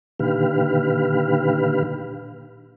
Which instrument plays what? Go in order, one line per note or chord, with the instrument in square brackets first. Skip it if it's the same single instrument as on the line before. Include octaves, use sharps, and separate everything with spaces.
[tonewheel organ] A#2 D3 D#3 G4 B4 F5